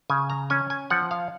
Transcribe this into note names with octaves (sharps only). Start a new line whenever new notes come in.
C#3 G#5
A#5
C#4 G#5
G#5
F3 F#5
F5